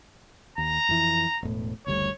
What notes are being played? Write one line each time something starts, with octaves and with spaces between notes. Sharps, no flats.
D#2 A#5
F2 E3
E1 A2
F#1 D2 G3 C#5